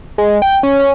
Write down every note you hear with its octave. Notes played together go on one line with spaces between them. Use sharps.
G#3
G5
C#4
C#4